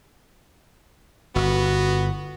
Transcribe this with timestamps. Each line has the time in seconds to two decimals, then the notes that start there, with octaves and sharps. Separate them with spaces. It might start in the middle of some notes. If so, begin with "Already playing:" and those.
1.36 G1 B3 F#4